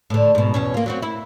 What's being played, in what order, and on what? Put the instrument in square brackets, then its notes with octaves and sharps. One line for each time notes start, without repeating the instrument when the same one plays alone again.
[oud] A2 D3
G#2 B2
E2 B2 C#4
A#3 F4
F#3 C4 F#4
E4